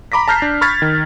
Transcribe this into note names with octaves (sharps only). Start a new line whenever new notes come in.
A#5 B5 D6 A#6 B6
A5 A#5 F6 G6 B6 C7
D4
B5 C#6 F6 G#6 A6 B6
D#3